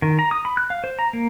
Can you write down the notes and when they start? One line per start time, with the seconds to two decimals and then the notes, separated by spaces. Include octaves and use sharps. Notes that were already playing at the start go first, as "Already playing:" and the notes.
0.02 D#3
0.19 A#5
0.31 D#6
0.45 B5
0.57 F#6
0.70 F5
0.84 C5
0.99 A#5
1.13 A#3